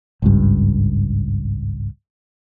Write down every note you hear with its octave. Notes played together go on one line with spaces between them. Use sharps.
G#1 C#2 G2